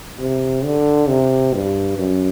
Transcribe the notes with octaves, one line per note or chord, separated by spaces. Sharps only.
C3
D3
C3
G2
F#2